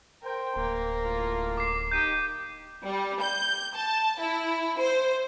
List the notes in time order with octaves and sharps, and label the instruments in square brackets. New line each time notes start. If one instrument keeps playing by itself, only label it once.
[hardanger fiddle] A#4 [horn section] C5 G5
[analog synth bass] D1 [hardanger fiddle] A#3
[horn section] A2 F4
[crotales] D6 C7
[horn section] D#4 G4 [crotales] G6 D#7
[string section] G3
G6
A5
E4
C5